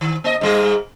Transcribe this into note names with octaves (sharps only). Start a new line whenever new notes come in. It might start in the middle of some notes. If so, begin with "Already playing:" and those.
D#3
A#3 D#5
G#2 G3 G#4